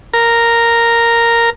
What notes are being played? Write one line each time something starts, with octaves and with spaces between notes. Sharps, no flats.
A#4